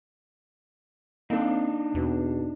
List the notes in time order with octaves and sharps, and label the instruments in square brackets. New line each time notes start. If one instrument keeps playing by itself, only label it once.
[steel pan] A#3 A4 [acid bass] C4 [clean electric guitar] D4 D#4
[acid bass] E2 [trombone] B2